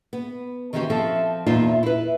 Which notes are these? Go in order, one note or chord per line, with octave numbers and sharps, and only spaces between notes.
B3
D#3 E3 C#4 F#4 G4 C5
F3 C4 A4 E5
E2 A#2 D#4 F4 E5
E4 B4